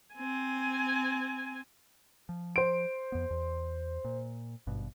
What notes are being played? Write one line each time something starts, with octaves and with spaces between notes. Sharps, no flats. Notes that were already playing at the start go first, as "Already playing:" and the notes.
C4 G#5
F3
C5 D7
F2 B3
E2
A#2
G#1 G2 B2